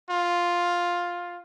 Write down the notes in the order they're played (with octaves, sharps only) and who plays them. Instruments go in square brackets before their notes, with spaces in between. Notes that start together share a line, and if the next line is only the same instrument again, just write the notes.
[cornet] F4